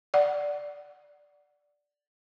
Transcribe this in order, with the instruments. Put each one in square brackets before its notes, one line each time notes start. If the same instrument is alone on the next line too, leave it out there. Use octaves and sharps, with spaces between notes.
[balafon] D5 F#5